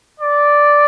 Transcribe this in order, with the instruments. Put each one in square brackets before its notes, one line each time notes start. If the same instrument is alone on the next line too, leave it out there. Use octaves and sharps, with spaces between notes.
[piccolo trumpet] D5